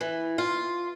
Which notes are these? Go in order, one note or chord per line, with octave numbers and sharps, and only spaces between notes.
E3
F4